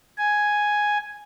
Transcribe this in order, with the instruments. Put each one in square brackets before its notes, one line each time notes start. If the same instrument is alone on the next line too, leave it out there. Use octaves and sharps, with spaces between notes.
[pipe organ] G#5